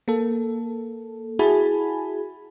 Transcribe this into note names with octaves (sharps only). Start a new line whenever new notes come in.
A#3 A4
E4 F#4 G#4 G#5 A5 B5